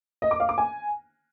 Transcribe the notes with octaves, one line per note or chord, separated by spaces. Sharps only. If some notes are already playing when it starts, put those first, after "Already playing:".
D#5
D6
F5
D6
G#5